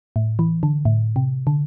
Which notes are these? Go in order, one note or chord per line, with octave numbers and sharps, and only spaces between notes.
A2
E3
D3
A2
C3
D3